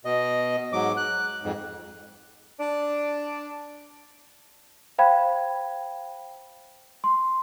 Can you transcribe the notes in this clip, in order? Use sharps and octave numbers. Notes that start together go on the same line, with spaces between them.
B2 D#5
G#2 F#3 D6
F#6
F2 G#2
D4
C5 F5 G5 B5 G#6
C6